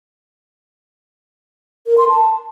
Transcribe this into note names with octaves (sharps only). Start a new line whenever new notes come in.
A#4
C6
A5